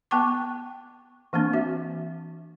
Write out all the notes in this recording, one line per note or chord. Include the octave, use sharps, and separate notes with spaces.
B3 G5 A5 C#6 D6
E3 A#3 C4 D4
F#4 E5